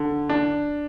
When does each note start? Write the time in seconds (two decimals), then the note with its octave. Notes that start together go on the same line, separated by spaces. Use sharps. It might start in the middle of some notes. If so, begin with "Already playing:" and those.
Already playing: D3
0.29 D4